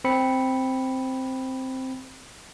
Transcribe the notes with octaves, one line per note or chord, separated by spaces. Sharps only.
C4 B5 C#7